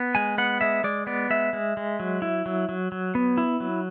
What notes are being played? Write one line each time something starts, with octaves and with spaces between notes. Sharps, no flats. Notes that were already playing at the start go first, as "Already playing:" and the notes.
Already playing: B3
G#3 G#5
B3 F#5
G#3 E5
G#3 D5
B3 D5
G#3 E5
G#3
G#3
F#3
E4
F#3
F#3
F#3
B3
E4
F#3